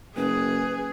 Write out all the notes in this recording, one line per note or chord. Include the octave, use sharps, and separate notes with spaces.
F#1 G#4 B4